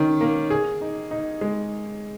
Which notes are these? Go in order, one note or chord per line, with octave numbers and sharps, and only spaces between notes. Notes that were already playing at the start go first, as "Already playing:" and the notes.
Already playing: D#3 C#4
A#3
G#4
D#4
D#4
G#3